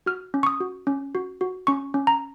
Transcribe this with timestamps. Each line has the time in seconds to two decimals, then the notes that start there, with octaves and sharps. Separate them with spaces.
0.06 F#4 F6
0.34 C#4
0.43 C#6
0.47 D#6
0.60 F#4
0.87 C#4
1.15 F#4
1.41 F#4
1.67 C#4 C#6
1.94 C#4
2.07 A#5